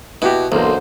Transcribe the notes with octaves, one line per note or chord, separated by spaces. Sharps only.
B2 E4 F#4 G4
B1 E2 D3 A#3 C5